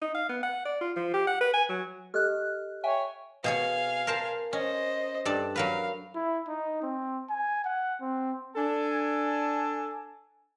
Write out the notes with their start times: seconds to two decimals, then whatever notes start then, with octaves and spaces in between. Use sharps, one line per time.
0.02 D#4
0.15 F5
0.29 B3
0.43 F#5
0.65 D5
0.81 F4
0.96 F3
1.14 G4
1.27 F#5
1.41 B4
1.54 G#5
1.69 F#3
2.14 G4 A4 D#5 F6 F#6
2.84 C#5 E5 G5 G#5
3.44 B2 G#4 C#5 F5 G#5
4.07 A#4 C5 A5
4.53 C#4 C5 D#5
5.25 G2 A4 D5
5.56 F#3 A#4 B4 F5
6.15 E4
6.48 D#4
6.83 C4
7.30 G#5
7.65 F#5
8.01 C4
8.56 D4 A4 G#5